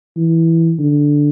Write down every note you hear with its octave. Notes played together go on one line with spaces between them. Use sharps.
E3
D3